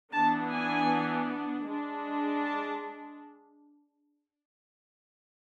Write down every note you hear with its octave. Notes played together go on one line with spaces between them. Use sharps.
E3 B3 D4 A5
G#5
G#3 D4
A5